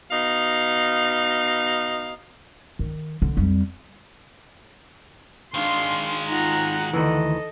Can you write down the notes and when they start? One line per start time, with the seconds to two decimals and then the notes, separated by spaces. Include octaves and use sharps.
0.10 B2 D#4 F5
2.79 D#3
3.22 D3
3.37 F2 G3
5.54 D#3 G#3 D4 F5 C6
6.28 D#4 F4 F#5 A#5
6.93 D2 D#3 E3 A4 D#5